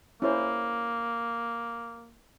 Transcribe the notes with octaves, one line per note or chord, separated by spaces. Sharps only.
A#3 C#4 E4 C5